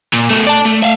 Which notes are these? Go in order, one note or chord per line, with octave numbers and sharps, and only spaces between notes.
A#2
B2 A3
D5 A5
A3
E5 F5